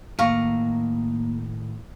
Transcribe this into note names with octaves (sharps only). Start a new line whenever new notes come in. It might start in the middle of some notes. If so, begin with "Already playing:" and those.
A2 D#3 A#3 F5 A#5 C#6